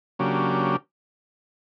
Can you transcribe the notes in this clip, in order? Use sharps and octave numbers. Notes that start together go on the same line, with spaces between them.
C#3 F#3 A#3 D4 G4